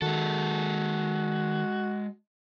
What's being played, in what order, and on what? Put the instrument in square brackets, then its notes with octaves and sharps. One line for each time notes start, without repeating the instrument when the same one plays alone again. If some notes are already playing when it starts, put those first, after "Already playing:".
[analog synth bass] D#3 [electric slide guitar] G#3 A4 [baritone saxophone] F#4